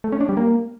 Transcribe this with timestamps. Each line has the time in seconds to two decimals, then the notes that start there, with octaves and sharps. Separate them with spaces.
0.04 A3
0.12 C#4
0.21 D4
0.29 G3
0.37 A#3